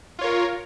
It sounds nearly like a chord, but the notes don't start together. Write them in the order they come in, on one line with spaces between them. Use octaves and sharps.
F4 C#5 A#4